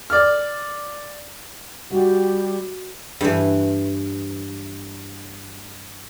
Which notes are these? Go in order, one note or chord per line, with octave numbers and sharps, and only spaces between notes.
D5 F6
G3 F#4 G4
G2 E3